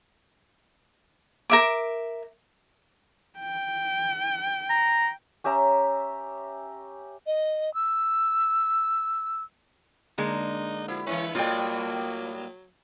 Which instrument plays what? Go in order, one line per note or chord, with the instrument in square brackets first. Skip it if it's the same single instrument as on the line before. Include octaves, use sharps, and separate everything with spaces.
[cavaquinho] A#4 E5 D6
[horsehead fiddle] G5
[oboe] A#5
[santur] C#4 G4 E5 A#5
[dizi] D#5
E6
[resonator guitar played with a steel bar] D3 G#3 A#3 [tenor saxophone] D#4
[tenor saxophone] F3 [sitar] E4 [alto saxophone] F#4
[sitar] E3 B4 [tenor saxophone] C#4 [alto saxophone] E4
[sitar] A2 G3 D5 [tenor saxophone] F#3 [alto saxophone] A#3 [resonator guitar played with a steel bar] F4 G5